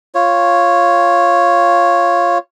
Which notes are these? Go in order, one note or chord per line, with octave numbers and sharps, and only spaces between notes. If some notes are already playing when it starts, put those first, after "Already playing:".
F4 C#5